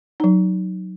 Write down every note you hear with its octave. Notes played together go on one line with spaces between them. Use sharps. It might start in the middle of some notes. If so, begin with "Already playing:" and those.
F#3 D#4